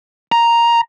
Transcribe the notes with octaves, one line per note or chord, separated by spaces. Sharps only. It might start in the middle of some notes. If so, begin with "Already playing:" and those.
A#5